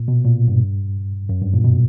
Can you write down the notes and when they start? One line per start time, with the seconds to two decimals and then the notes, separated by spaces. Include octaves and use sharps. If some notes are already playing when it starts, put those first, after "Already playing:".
Already playing: A#2
0.08 B2
0.25 A#2
0.48 G2
1.29 F#2
1.41 G2
1.53 A#2
1.64 B2